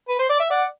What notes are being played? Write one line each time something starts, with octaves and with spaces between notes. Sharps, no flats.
B4
C5
D5
E5
D5 F#5